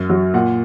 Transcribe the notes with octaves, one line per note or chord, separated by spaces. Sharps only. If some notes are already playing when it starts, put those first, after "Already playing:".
Already playing: F#2
F#3
A#2 F#5